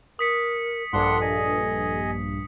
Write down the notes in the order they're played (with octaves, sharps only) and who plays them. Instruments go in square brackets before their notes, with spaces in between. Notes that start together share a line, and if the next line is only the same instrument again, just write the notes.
[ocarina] A#4 [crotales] D#6 B6 C#7
[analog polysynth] A#1 G2 [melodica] D4 F#5 C6 [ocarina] A4
[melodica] D#5 G#5